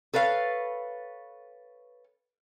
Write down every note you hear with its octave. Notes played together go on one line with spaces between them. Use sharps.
A4 B4 C#5 F5